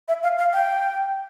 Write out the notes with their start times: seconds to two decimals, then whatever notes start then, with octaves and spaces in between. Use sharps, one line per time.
0.08 E5
0.23 F5
0.38 F5
0.53 G5